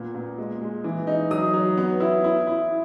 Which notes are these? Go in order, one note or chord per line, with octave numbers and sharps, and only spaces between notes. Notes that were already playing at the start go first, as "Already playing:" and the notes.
Already playing: A#2 B3
A#2
G#3
G#3
E3
D#4
F#3 D#6
F#3
B3
E4
E4
E4